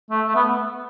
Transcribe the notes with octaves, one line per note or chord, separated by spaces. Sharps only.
A3
A3
B3